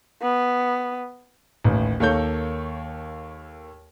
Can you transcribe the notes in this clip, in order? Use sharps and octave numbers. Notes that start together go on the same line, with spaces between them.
B3
A1 D#2 A2
D#2 A#3 A4 C#5 G6